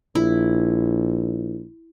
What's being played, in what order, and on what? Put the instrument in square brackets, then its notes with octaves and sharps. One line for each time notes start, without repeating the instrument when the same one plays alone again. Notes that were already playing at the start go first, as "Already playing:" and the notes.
[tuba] A#1 [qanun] E4